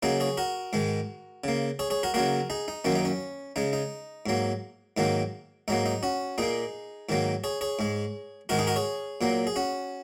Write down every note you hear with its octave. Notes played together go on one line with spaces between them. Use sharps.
C#3 F#3 A#3 D#4 G#4
G#4 C#5
F#4 A#4
G#2 D#3 G#3
C#3 A#3
G#4 C#5
G#4 C#5
F#4 A#4
C#3 F#3 A#3 F#4 A#4
D#4 G#4
D#4
F#2 D#3 F#3 A#3 C#4
D#4
C#4
C#3 G#3 D#4
D#4
G#2 F#3 A#3
G#2 D#3 F#3 A#3
G#2 F#3 A#3 D#4
D#4
C#4 F#4
A#2 A#3 D#4 G#4
G#2 D#3 F#3 A#3
G#4 C#5
G#4 C#5
G#2 G#3
G#2 D#3 G#3 F#4 A#4
D#4 G#4
F#4 A#4
G#4 C#5
A#2 F#3 A#3
G#4
C#4 F#4